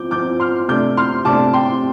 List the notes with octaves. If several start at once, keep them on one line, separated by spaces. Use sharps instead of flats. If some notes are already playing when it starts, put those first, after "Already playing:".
Already playing: F3 C4 D6 G6
F3 C4 D6 G6
C6 F6
C3 A3 D4 D6 G6
C6 F6
C3 A3 D4 A5 D6
G5 C6